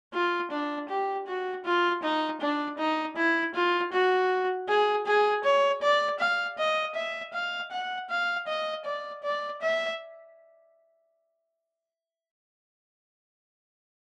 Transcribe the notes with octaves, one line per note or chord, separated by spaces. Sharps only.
F4
D4
G4
F#4
F4
D#4
D4
D#4
E4
F4
F#4
G#4
G#4
C#5
D5
F5
D#5
E5
F5
F#5
F5
D#5
D5
D5
E5